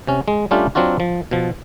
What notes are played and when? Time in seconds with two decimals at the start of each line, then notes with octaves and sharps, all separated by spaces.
0.07 C3 C#4
0.28 G#3
0.51 G3 A3 C#4 D4 F4 G4
0.75 F#3 C4 D4 F4 F#4
1.00 F3
1.31 B2 F3